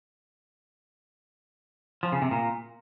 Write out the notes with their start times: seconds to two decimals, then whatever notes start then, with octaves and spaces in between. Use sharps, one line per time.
2.03 F3
2.12 C#3
2.22 C3
2.31 A#2